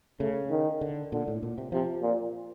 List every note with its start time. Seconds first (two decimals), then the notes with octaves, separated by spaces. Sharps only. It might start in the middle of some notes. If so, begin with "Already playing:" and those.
0.20 C#3 A3
0.51 D#3
0.81 D3
1.12 A#2 D3
1.28 A2
1.43 A#2
1.58 C3
1.72 C3 F3
2.02 A#2